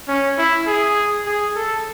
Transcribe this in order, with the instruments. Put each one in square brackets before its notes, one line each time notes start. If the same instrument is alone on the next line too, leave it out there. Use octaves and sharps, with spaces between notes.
[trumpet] C#4
E4
G#4
G#4
A4